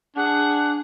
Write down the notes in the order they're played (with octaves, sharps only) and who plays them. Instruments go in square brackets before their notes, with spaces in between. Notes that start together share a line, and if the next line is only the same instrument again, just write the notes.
[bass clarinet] D4 [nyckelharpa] G#4 [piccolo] F#5